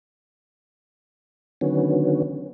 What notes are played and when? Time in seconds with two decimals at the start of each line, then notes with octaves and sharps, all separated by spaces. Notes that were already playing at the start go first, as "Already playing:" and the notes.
1.61 D3 D#3 F#3 B3 C#4